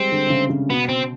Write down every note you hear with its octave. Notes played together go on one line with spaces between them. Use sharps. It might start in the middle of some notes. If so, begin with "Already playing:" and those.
Already playing: G3 G#3 C4
D3
C3
C#3
C#3
B2 B3
C4